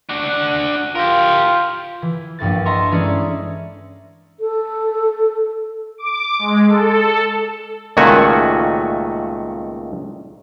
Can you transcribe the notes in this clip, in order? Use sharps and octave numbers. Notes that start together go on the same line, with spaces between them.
D4 F#4
F4 G4 A#4
E3
A#1 G2 A3 A6
D#5 E5 A5 A#5 C6 C#6
E3 G#3 A3 C#4 G#4 D5
A4
D6
G#3
A4
C#2 A#2 D#3 A3 F#4 G#5